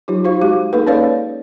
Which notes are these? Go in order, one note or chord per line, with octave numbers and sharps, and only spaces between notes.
F#3 D#4 F4 G4
D#4 F#4 G4 C5 F5 C#6
G#3 G4 F5
A#3 D#4 G#4 A4 B4
C#4 A4 B4 C#5 D5 F5